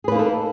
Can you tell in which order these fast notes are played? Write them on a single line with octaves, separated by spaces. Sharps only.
G#4 B4 A#3 D#4 A4